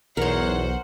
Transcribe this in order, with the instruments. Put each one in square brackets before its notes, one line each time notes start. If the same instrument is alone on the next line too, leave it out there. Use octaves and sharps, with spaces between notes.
[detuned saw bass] B1 [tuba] E2 [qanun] A#4 C#5 [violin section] C5 F#5